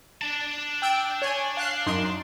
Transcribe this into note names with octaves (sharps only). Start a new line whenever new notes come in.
D4 A5
G5 E6 D7
C#5 G#5
F5 F#6 C7
F#2 D#4 C6